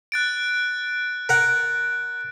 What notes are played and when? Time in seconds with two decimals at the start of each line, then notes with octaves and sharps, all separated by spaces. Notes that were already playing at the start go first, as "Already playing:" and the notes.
0.12 F#6 A6 D7
1.29 A#4 F#5